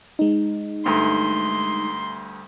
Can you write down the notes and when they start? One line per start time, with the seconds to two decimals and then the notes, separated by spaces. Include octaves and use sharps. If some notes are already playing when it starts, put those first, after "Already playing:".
0.19 G#3 D#4
0.85 D2 G2 A3 C6